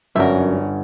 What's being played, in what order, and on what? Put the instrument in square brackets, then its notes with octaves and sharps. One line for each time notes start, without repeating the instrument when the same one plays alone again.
[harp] G1 [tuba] F#2 [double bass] C#4 D4 [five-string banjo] A#4 E5